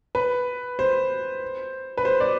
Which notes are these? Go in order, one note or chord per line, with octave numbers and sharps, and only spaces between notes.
B4
C5
B4
C5
D5